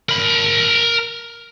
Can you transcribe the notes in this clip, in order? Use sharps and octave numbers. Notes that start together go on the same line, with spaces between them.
A#4 B5